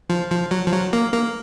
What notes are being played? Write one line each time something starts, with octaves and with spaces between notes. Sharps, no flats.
F3
F3
F#3
F3
F#3
A#3
A#3